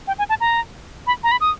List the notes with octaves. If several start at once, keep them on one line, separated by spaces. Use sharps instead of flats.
G5
G#5
A5
A#5
B5
A#5
B5
D#6